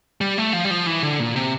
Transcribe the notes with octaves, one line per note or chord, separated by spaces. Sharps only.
G3
A3
F3
G3
F3
E3
D3
A#2
C3